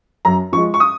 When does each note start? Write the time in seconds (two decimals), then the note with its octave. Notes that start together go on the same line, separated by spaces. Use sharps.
0.25 F#2 A#5
0.53 F3 C#6
0.57 G#3
0.74 C#6
0.80 D#6